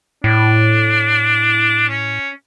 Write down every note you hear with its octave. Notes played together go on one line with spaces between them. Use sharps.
A2 D4
C#4